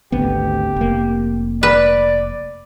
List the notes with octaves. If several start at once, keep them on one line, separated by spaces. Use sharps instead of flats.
G#1 D2 B3 G4
F1 A#3
B4 D5